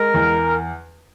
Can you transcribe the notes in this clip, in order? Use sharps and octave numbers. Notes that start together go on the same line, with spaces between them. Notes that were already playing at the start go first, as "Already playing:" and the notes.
Already playing: G#3 A#4
E2